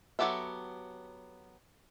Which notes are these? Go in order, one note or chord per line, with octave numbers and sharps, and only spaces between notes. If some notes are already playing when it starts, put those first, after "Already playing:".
F#3 B3 G4 A4 E5